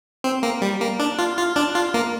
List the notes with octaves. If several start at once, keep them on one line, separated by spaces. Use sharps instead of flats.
C4
A#3
G3
A#3
D4
F4
F4
D4
F4
A#3